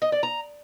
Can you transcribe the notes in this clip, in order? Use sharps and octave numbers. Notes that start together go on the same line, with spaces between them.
D#5
D5
A#5